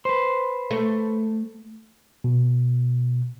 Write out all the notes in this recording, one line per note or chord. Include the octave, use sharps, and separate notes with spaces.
B4 C5
A3
B2